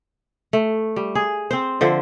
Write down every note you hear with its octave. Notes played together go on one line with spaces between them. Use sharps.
A3
G3
G#4
C4 C5
D3 F3 C5 E5